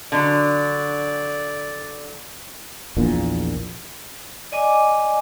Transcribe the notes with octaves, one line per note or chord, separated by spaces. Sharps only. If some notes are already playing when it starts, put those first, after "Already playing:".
D3 F#3 D5
A#1 E2 A#2
D5 D#5 G#5 D6